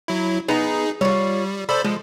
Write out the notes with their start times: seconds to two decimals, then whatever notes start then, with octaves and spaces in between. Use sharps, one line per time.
0.08 F#3 E4
0.48 B3 D#4 G#4 A#5
1.01 G3 F4 C#5
1.69 A4 C5 D5 B5
1.85 F3 G#3